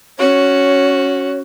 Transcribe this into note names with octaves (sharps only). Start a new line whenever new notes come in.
C#4 F#4 C#5